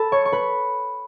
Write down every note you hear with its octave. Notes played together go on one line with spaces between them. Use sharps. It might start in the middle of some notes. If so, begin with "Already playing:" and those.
Already playing: A4 A5 B5
C#5 C#6
C#6
B4 B5